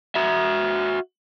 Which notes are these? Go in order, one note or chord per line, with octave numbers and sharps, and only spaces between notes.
F#4 E5